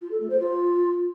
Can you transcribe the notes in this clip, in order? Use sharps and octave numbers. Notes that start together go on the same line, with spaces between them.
F4
A4
A3
C5
F4